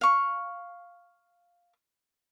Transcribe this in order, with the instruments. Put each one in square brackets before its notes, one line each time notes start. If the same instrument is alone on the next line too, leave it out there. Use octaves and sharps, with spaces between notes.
[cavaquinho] F5 C#6